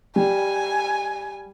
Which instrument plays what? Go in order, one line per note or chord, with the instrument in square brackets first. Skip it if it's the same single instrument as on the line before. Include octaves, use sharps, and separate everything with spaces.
[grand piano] G3 [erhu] G#5